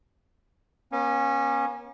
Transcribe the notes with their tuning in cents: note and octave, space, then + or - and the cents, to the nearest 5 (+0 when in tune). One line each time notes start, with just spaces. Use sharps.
A#3 +45 C#4 -15